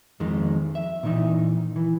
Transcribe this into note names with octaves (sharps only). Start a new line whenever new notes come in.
F2 D#3 G#3
E5
A#2 E3 D#4
E3